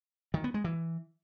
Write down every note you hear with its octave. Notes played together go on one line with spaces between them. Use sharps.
D#3
B3
G#3
E3